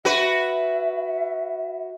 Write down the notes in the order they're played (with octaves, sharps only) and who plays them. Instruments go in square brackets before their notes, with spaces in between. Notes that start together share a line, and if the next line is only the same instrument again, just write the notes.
[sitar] F#4 B4 [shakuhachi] E5